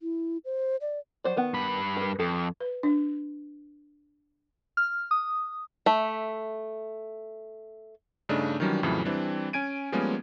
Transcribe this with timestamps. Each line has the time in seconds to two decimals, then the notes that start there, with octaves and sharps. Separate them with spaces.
0.01 E4
0.45 C5
0.81 D5
1.24 F#3 C5 D5
1.36 D#3 B3
1.54 G2 B5
1.97 A#4 B4
2.19 F2 A4
2.60 B4
2.83 D4
4.77 F6
5.11 D#6
5.86 A3 E5
8.29 G2 C#3 A3 D4 D#4
8.60 D#3 E3 F#3 G3 C#4 D4
8.83 F2 A2 C#3 E3 F#3
9.05 E3 G3 C4 D4
9.53 C#4 G#5 G#6 D7 D#7
9.92 F3 G3 G#3 A#3 B3 C#4